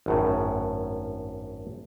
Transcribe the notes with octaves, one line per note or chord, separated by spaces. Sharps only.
G#1 F#2 A2